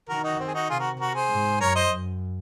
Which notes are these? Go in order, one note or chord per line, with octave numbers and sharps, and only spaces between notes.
D#3 F#4 A#4
D#4 F#4
C4
G#4
D#4 F#4
C3 F4 G#4
F#4 A#4
F#4 A#4
G#4 C5
G#2
F#2 A#4 C#5
C5 D#5
F#2